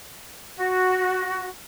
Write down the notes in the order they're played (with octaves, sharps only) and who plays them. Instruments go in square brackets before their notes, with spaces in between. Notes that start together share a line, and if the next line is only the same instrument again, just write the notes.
[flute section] F#4